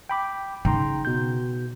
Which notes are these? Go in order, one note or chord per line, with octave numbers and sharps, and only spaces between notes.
G5 B5 D6
C#3 D#4 G5 A#5 C6
B2 G6